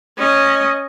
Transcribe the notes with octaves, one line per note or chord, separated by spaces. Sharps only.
C#4 D#5